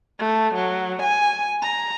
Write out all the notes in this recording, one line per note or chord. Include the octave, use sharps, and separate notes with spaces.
A3
F#3
G#5
A#5